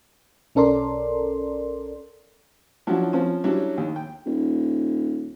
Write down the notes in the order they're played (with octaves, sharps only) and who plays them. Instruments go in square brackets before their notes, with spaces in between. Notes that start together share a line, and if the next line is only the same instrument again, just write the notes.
[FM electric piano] B1 C#4 A4 A#4 D5 C6
[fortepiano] F3 F#3 C#4 D4 E4 F#4
F3 C4 C#4
F#3 G3 C#4 D4 E4
D#2
G5
[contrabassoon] D#1